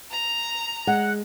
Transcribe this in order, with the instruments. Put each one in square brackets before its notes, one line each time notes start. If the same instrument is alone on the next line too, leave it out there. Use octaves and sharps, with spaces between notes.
[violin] A#5
[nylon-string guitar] G#3 [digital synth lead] F#5